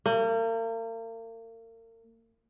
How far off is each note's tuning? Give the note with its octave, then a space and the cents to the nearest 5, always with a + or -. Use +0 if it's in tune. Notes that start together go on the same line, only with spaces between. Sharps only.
A#3 -40